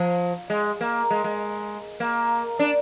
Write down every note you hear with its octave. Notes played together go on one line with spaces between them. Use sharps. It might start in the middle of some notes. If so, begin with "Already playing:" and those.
Already playing: F3
G#3
A#3
G#3
G#3
A#3
D4